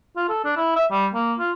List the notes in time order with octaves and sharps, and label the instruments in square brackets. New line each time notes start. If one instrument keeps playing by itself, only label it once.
[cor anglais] F4
A4
D4
E4
E5
G3
A#3
F4